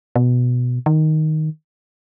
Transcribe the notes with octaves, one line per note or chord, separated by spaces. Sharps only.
B2
D#3